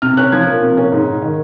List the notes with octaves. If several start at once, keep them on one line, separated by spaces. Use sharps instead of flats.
C3 F6
C#4 F#6
F3 G#6
A#3
C3
C#4
G#2
G#2
D#3